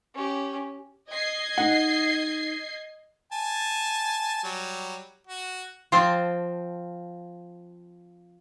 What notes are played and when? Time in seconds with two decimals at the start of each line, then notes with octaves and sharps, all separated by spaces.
0.14 C#4 G4
1.10 D#5 G#6 C7
1.58 D#4 F#5
3.32 G#5 A5
4.44 F#3 G3
5.27 F#4
5.92 F3 C4 C5 A5